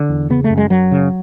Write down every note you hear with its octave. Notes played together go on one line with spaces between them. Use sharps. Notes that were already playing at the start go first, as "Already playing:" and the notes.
Already playing: D3
E2
C#3 B3
A3
F#2
G#3
F#2 F#3
C#3